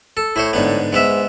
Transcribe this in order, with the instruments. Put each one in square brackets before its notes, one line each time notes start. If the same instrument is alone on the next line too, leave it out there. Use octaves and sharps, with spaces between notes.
[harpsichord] A4
[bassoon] A2 [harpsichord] E4 C5 C#5
[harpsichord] G#2 D3 B3
[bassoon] G#2 [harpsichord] G#3 B3 E5